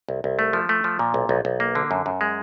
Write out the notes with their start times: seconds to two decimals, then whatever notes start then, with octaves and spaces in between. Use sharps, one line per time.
0.09 C2
0.24 C2
0.39 A3
0.53 F3
0.69 A3
0.84 F3
0.99 A#2
1.14 B1
1.29 B1
1.45 B1
1.60 A#3
1.75 D3
1.91 F#2
2.06 F#2
2.21 G#3